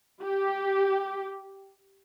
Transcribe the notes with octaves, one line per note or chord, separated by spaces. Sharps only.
G4